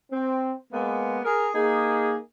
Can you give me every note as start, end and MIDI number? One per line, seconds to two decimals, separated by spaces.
0.12 0.53 60
0.72 1.19 56
0.72 1.19 58
0.72 1.19 59
1.24 1.48 68
1.24 1.48 70
1.54 2.17 58
1.54 2.17 63
1.54 2.17 68